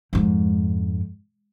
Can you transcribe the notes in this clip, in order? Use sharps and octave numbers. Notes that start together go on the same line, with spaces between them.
F2 G#2